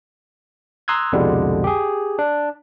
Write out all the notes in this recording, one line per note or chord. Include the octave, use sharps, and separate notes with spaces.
A#5 C6 D#6 E6 F#6 G#6
C2 F2 B2 D3 G3 G#3
G4 G#4
D4